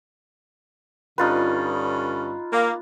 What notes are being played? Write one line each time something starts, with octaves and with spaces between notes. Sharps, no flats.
G2 D3 C#4 D#4 F4 B4
A#3